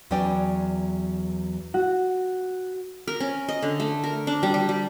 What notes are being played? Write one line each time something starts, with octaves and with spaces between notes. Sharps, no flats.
E2 F#3 C#4 B4 D5 G5
F#4
A#4
C#4
D#5
D3
A3
A#4
D4
G3
G3
G3